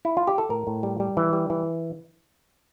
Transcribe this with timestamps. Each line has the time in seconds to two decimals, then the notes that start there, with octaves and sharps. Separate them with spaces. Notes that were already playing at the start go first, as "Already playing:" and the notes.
0.05 E4
0.17 F4
0.27 G4
0.38 A4
0.49 A2 A#4
0.67 A2
0.83 G3
1.00 G3
1.17 E3
1.33 G3
1.50 E3